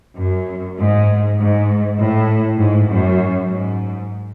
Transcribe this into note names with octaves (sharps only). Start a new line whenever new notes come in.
F#2
G#2
G#2
A2
G#2
F#2
G#2